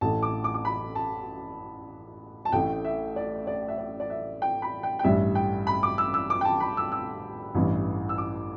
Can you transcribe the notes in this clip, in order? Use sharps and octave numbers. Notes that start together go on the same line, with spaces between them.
A1 A2 A3 A5
D6
D6
D6
B5
A5
A5
A1 A2 A3 G5
E5
D5
D5
E5
D5
D5
E5
G5
B5
G5
G5
A1 G2 G3 E5
G5
B5
D6
E6
E6
D6
G5
A5
B5
E6
E6
A1 G2 E3
E6
D6